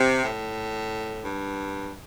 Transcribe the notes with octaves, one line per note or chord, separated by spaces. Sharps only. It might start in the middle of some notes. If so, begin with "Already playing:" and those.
Already playing: C3
A2
G2